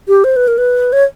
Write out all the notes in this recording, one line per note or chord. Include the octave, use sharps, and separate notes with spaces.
G4
C5
B4
A#4
B4
C#5